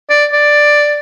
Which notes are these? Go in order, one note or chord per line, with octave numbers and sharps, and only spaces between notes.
D5
D5